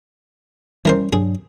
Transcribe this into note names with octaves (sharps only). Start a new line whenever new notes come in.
E3 G3 C#4 A#4 C5
G2 F#3 D4 G#4